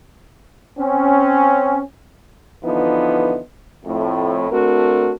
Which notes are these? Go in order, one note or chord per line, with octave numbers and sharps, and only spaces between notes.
C4 C#4
D3 E3 F3 B3 D#4
F2 A2
A3 C4 D4 F#4 A#4